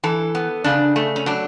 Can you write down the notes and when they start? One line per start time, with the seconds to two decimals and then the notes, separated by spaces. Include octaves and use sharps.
0.04 E3 A4
0.35 B3
0.64 C#3 D4
0.96 A3
1.16 C#4
1.26 F#3 D4